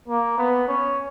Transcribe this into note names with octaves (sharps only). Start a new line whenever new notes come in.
A#3
B3
C#4